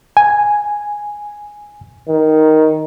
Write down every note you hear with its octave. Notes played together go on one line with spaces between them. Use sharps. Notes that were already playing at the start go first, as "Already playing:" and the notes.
G#5
D#3